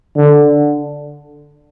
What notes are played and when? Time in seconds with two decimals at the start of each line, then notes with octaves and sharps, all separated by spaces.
0.17 D3